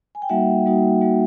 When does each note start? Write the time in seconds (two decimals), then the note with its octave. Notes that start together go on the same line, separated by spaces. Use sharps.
0.15 G#5
0.22 G5
0.29 G3 A#3 D#4 F#4 E5 F#5
0.66 G3 A#3 D#4 F#4
1.01 G3 A#3 D#4 F#4